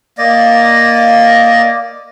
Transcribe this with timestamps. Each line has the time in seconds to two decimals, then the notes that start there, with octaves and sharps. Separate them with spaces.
0.18 A#3 D5 D#5